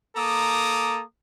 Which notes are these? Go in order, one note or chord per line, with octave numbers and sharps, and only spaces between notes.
A#3 A4 A#5 D6 D#6